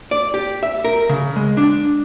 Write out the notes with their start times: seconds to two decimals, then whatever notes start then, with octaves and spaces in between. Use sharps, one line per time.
0.11 D5
0.34 G4
0.63 E5
0.85 A#4
1.09 C#3
1.36 G#3
1.57 D4